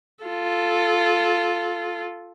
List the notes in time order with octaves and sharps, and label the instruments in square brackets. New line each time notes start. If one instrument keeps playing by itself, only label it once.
[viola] F4 A4